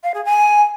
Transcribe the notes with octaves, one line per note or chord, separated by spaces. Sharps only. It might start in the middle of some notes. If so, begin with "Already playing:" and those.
F5
G#4
G#5